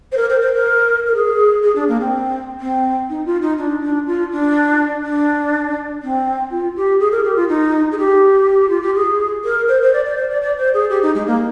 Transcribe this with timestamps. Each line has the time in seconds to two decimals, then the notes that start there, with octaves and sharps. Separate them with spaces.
0.12 C5
0.17 A#4
0.30 C5
0.41 C5
0.54 A#4
1.07 A#4
1.15 G#4
1.63 G#4
1.76 D4
1.88 A#3
2.00 C4
2.60 C4
3.10 D#4
3.26 F4
3.42 D#4
3.58 D4
3.82 D4
4.07 F4
4.32 D4
5.04 D4
6.03 C4
6.51 F4
6.76 G4
7.00 G#4
7.12 A#4
7.25 G4
7.36 F4
7.49 D#4
7.92 G#4
7.98 G4
8.69 F4
8.82 G4
8.95 G#4
9.44 A#4
9.68 C5
9.82 C5
9.93 D5
10.05 D5
10.17 C5
10.30 D5
10.42 D5
10.58 C5
10.74 G#4
10.90 G4
11.02 D#4
11.15 G#3
11.27 A#3